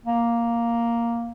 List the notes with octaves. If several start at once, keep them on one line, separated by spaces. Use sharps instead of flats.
A#3